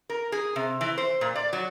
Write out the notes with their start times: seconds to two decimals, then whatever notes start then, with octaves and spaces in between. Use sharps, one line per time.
0.09 A#4
0.32 G#4
0.56 C3
0.81 E3
0.98 C5
1.21 A#2
1.36 D5
1.53 F#3